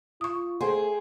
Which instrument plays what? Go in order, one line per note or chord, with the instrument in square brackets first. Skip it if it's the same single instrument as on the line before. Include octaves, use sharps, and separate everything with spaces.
[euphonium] F4 [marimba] C#6 D#6
[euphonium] A3 [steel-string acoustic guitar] G#4 [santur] C5 G5 G#5